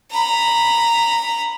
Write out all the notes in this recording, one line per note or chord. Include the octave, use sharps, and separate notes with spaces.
A#5 B5